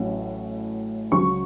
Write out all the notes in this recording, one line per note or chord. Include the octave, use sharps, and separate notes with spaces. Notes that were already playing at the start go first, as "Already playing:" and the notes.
Already playing: A1 A2 F#3 C#4
C#2 C#3 F#3 C#6